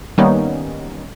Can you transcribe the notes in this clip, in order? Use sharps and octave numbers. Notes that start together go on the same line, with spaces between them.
D#3 G3 A#3 B3 C#4 D#4